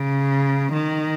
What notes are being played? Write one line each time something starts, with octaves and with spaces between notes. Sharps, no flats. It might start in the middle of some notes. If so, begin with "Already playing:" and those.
Already playing: C#3
D#3